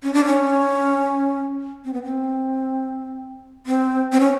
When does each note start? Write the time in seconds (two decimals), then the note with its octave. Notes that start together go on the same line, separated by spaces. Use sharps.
0.03 C#4
0.14 D4
0.26 C#4
1.85 C4
1.93 B3
2.04 C4
3.66 C4
4.12 C4
4.20 C#4